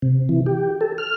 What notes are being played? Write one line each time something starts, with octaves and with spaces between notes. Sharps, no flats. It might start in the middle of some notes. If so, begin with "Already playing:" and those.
C3
E3
G4
A4
F6